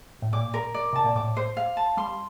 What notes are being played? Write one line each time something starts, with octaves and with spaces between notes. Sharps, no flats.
A2
A#2 D6
A#4
D5
C3 A5
A#2
A2 D6
C5
F5
A5
G3 C6